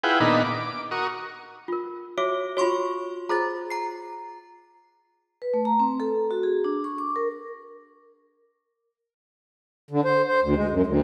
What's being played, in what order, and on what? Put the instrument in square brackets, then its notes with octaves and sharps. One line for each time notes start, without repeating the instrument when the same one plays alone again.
[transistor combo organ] E4 F4 G#4 B4 F#5 G5
A#2 D#3 B3 D4 D#4 B5
D6
F#4 A#4 C#6 D#6
[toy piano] F4 A#4
[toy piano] F#4 E5 D6 [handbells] C#5
[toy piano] F4 F#4 [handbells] C#5 C6 C#6
[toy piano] F4 G#4 C5 [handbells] A#5 A6
[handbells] A#5 C7
[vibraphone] B4
A3
A#5
C4
A4
F#4
G#4
D4
C#6
D6
A#4
[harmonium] D3
C5
C5
D2
G#3
F#2
D2